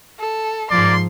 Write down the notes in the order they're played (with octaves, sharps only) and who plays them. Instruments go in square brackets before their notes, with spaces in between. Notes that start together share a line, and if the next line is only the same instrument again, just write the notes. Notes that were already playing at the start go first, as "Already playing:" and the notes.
[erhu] A4
[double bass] G#2 F3 [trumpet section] A#3 D5 [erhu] C6